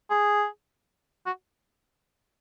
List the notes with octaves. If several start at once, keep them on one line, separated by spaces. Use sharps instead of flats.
G#4
F#4